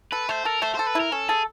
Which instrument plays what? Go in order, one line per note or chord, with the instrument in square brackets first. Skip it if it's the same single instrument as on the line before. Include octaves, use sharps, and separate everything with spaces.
[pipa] A4 [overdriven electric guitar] B4
[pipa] A3 [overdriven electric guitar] C5
[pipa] A4 [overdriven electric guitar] A#4
[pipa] A3 [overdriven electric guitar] C5
[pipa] A4 [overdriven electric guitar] C5
[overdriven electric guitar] B4
[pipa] E4
[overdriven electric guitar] A#4
[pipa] C#4 [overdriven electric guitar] A4
[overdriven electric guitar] G#4 [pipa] A4